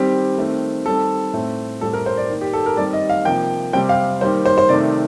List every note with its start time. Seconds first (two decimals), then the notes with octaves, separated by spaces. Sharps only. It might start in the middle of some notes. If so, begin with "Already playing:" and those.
Already playing: D#3 G3 C4 G4
0.38 D#3 A3 C4
0.86 D#3 G3 C4 A4
1.33 A2 A3 C4
1.81 A2 G3 C4 A4
1.93 A#4
2.06 C5
2.17 D5
2.30 D#3 A#3
2.41 G4
2.53 A4
2.66 A#4
2.77 D#3 G3 C4 D5
2.93 D#5
3.10 F5
3.25 C3 F3 A#3 G5
3.73 C3 G3 C4 G5
3.89 F5
4.21 D#3 G3 A#3 C5
4.45 C5
4.58 C5
4.69 C3 D#3 A3 D5